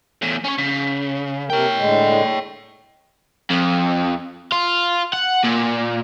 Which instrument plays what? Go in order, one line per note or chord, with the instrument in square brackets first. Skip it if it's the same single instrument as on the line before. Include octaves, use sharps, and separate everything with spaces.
[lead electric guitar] E2 A2
C#4 C#5
C#3
[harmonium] C3 A#4 [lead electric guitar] C#5 G5
[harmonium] A2 D3 G#3
[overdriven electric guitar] F2
F4
F#5
A#2